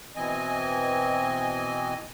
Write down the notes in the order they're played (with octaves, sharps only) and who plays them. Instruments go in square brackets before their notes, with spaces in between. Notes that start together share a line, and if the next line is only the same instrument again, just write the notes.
[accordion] B2 E3 C4 D#5 G#5